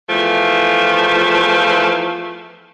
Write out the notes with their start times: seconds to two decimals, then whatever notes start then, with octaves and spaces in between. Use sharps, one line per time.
0.09 E2 F3 A3